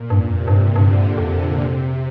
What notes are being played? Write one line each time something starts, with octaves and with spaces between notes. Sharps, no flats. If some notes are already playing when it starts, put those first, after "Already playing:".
Already playing: A#2
G2
F2
C3
G2
G2 D3
F2
C3